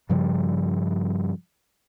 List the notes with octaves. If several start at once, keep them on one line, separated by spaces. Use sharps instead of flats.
G2 C#3 F3 G3